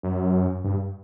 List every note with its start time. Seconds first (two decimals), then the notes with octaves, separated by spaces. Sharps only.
0.03 F#2
0.64 G2